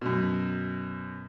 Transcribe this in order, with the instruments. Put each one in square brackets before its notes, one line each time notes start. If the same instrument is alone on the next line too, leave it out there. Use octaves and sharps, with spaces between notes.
[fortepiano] F#2 B2